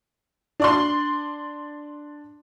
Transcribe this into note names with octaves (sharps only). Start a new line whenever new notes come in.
D4 D5 C6